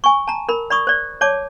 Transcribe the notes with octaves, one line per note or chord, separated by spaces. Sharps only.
G#5 C#6
A5 A#5
A#4 B5
D5 B5 C#6 D#6
C5 D5
C#5 D5 A5 D6